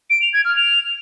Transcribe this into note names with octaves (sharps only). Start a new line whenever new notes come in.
D7
F7
G#6
F6
F7